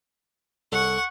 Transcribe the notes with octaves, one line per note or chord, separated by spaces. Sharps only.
C2 A4 F#5 C#6